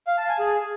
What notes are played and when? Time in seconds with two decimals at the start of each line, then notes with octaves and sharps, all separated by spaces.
0.07 F5
0.18 A5
0.28 G#5
0.39 G#4